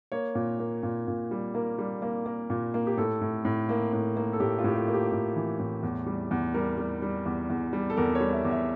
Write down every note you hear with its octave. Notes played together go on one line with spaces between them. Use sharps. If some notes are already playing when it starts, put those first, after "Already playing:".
A#3 C#5
A#2
A#3
A#2
A#2
G3
A#3 A#4
G3
A#3
A#3
A#2
A#3
G4
A2 A4
A2
A2
A#3
A2
A#3
A4
A2 G4
F4
A2 G4
F4
A#3
G4
A2
E3
A2
E2
G3
E2
G3 A#4
G3
G3
E2
E2
G3
A4
E2 A#4
C#5
G3
E5
E2
E5